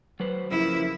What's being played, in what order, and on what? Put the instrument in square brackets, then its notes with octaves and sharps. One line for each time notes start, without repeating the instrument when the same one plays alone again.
[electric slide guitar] F#3 B4 C5
[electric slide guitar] C#3 F3 A#3 [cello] E4